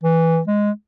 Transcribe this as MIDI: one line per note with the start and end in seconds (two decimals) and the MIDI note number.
0.04 0.39 52
0.48 0.71 56